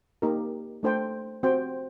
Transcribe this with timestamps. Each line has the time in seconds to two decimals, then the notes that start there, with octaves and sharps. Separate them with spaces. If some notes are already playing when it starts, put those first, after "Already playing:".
0.22 A#3 D#4 G4 A#4
0.83 A3 D4 A4 C5 G5
1.43 C4 F#4 C5 G5